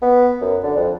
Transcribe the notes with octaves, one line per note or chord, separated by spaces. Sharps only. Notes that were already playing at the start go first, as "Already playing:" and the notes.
B3
F#2
D3
F2